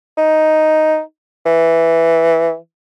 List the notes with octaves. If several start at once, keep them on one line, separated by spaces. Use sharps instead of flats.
D#4
E3